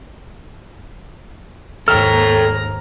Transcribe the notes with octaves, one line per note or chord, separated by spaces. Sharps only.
D#2 G#2 A4 G5 A#5 F6